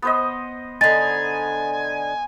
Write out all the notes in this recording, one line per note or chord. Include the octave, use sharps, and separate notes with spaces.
B3 C5 D#5
D3 D#4 G#5 A6